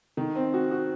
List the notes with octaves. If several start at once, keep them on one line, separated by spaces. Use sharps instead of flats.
D#3
C4
F#4
F#4